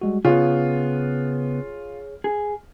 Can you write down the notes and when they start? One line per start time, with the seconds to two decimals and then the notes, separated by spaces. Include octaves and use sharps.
0.01 G3 G#3 F#4
0.25 C#3 B3 F4 G#4 C#5
2.24 G#4